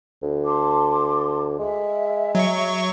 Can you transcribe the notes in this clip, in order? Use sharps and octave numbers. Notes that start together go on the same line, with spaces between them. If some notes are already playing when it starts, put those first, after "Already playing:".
D2
A5 C6 D6
G#3 E5
F#3 C#6